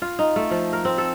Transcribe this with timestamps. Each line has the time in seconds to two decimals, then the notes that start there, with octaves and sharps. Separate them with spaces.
0.02 F4
0.19 D#4
0.36 A3
0.51 F3
0.73 A#4
0.85 C4
0.98 A4